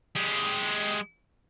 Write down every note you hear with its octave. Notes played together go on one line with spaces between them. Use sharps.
G#3 G4